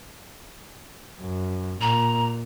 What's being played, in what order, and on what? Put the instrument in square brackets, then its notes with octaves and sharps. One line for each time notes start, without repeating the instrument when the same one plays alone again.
[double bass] F#2
[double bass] A#2 [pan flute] A#5